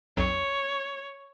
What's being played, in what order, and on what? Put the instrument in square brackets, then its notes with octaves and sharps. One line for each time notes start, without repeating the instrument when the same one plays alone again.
[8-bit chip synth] B1 F2 F#3 [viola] C#5